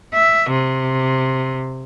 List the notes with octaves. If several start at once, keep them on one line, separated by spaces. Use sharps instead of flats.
E5
C3